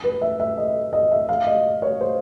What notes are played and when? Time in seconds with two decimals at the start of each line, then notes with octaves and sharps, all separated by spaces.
0.04 B4
0.21 E5
0.40 E5
0.57 D#5
0.93 D#5
1.11 E5
1.29 F5
1.47 D#5
1.82 C#5
2.01 C5